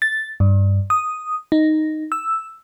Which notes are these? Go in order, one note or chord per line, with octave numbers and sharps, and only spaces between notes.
A6
G2
D#6
D#4
E6